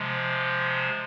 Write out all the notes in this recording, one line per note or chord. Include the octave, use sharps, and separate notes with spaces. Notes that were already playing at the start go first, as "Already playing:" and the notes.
Already playing: C3 F3 G#3